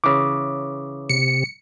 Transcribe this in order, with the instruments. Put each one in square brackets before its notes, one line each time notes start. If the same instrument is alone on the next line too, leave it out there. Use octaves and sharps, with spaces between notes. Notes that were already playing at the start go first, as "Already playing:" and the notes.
[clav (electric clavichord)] C#3 E3 [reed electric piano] D6
[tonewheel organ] C3 [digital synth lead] C#7